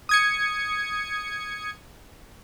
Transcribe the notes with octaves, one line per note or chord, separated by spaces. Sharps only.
D#6 G#6 C#7